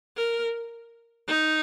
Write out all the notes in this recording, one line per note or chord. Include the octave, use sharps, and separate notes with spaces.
A#4
D#4